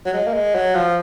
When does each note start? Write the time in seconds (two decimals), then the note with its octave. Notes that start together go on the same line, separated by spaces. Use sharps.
0.05 F#3
0.13 G#3
0.26 A#3
0.33 G#3
0.55 F#3
0.75 F3